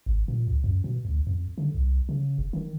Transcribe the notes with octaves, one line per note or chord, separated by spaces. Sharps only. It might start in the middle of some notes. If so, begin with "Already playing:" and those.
G#1
A#2
C#2
F#2
B2
D2
F2
D3
C2
C#3
E1
D#3